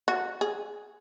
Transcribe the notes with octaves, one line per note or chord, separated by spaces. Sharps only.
F#4
G#4